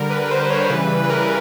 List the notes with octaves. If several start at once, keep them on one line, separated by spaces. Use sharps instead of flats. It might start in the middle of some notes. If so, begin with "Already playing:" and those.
Already playing: D3 G3 A#4
B4
B4
C5
C#5
A#4
C#3 E3 G3 B4
B4
A#4